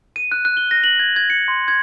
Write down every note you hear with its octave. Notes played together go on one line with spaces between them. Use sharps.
D#7
F#6
F#6
G7
A#6
F#7
G#6
G#6
C#7
C6
G#6